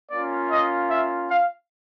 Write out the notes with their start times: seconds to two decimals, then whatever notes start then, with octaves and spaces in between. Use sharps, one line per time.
0.11 A#3 C#4 F4 D5
0.52 D#5
0.90 E5
1.31 F5